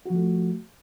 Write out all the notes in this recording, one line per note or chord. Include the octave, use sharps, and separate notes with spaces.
F3 A3 F#4